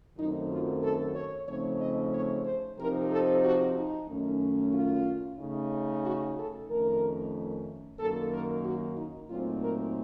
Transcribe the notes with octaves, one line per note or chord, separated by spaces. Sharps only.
F#2 D#3 F#3 A3 C4 D#4
F4
A4
C#5
C#3 F3 A3 C4 D#4 C#5
D#5
C#5
C5
C3 F3 C4 D#4 A#4
A4
F#4
D#4
F#2 D#3 A3 C#4
F4
C#3 A3 D#4
F#4
A4
F2 D#3 A3 C#4 A#4
F#2 D#3 A#3 A4
A#4
F#4
D#4
A#2 F#3 A3 C4 D#4 F4
A#4